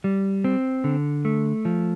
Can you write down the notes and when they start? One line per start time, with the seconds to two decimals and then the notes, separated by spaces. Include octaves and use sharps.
0.04 G3
0.44 C4
0.84 D3
1.25 A3
1.65 F3